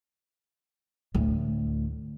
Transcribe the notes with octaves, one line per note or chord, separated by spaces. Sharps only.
D2 A2